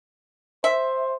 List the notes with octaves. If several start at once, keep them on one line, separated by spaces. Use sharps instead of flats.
C5 E5